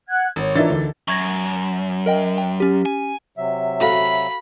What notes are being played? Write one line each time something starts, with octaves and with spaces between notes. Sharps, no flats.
F#5 F#6 G#6
G#1 C#5
E3 D4 D#4 F4 A#4 D5 E5 A6
D2 D3
F#2 C#6 G#6 A#6
A#4 D#5 G5
G5
C#4 G4
G#5
C3 F#3 E5
F#4 A4 F5 B5